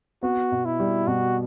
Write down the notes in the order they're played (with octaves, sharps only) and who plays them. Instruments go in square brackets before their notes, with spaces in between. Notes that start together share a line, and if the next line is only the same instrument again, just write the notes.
[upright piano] B3 [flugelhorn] F#4
[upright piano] B2
[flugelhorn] E4
[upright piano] G3
[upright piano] B2 [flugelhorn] F#4